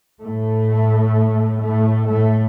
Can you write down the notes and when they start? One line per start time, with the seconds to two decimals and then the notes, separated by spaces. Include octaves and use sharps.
0.23 A2 A3
1.64 A2 A3
2.11 A2 A3